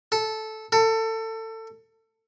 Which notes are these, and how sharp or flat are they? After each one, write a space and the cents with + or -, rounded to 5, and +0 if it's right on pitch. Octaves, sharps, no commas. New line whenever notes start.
A4 -10
A4 +25